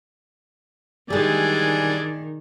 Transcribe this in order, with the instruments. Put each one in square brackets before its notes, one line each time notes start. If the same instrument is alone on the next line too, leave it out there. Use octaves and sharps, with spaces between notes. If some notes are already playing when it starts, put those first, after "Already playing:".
[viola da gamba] D#3 [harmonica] E3 D4 G#5 [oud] G3 G#3 [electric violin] G#4 D5